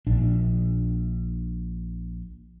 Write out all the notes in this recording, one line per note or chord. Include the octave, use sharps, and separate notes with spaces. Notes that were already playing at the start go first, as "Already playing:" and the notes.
A#1 D4